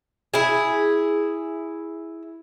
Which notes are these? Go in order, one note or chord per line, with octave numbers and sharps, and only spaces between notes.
E4 G#4